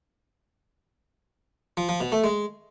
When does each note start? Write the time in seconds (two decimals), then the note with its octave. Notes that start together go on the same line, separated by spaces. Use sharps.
1.77 F3
1.89 F3
2.01 B2
2.12 A3
2.24 G#3